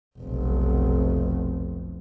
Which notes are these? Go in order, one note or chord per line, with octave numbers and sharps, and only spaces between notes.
F1 B1